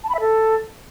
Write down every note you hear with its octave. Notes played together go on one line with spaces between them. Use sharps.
A5
B5
E5
A4